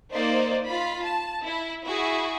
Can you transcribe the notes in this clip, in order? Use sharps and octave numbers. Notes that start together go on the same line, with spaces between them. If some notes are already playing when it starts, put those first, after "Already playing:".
A#3 D#4 C5 D5
F4 B5
A5
E4
E4 F#4 G#4